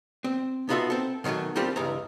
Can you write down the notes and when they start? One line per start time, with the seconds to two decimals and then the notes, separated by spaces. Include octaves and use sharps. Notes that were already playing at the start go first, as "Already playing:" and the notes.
0.24 C4
0.69 B3 D#4 F4 F#4 A4 E5
0.90 C4 A4
1.24 B2 D#3 E3 F#3 A3
1.56 G3 A#3 C4 F4 G4 A4
1.76 C#2 G2 E3 G#4 A#5